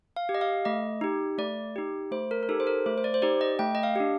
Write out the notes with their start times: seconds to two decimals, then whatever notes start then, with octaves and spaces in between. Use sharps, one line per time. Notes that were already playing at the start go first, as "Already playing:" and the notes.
0.16 F5
0.29 G4
0.35 D#5
0.41 F5
0.65 A3 D#5
1.01 D#4 G4
1.38 A3 D5
1.76 D#4 G4
2.11 A3 C5
2.31 A#4
2.43 A#4
2.49 D#4 G4 A4
2.60 C5
2.67 A#4
2.86 A3 C5
2.98 C5
3.04 D5
3.14 C5
3.22 D#4 G4 D5
3.41 D#5
3.59 A3 G5
3.75 D#5
3.83 F5
3.96 D4 G4